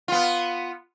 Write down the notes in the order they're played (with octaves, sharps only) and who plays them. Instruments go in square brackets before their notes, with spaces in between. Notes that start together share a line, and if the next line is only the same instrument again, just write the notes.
[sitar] B3 F4